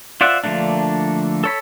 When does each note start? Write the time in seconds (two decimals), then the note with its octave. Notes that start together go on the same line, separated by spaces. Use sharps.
0.21 F4 C5 D5 E5 F#5
0.44 D3 F3 A3 A#3 D4
1.44 A4 C#5 B5